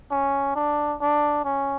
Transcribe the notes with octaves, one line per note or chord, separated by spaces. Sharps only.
C#4
D4
D4
C#4